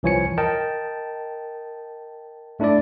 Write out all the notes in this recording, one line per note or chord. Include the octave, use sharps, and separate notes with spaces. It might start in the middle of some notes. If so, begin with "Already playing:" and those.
C2 E3 F3 C#5 G#5 C#7
A#4 D#5 G5 A5
A3 D4 E4 A4 D5